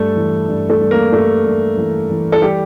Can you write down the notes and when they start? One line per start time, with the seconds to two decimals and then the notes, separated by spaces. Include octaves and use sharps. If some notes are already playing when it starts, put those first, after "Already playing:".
Already playing: G2 A3 A4
0.16 E3
0.49 G2
0.69 A3 A4
0.81 G2
0.91 A#3 A#4
1.13 G2 A3 A4
1.45 G2
1.77 E3
2.10 E3
2.32 A4
2.42 G3 G4